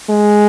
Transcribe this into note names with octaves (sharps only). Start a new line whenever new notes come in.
G#3